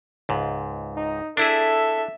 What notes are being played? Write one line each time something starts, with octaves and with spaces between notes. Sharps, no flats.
C#2 G#2
D#4
D4 E4 G#4 A4 E5